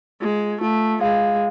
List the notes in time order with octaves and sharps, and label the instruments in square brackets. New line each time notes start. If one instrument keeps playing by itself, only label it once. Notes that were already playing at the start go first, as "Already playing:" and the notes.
[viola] G#3 [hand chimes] F4
[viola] A3 [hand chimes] F4
[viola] G#3 [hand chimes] F5